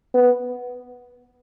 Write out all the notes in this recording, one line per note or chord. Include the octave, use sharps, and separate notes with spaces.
B3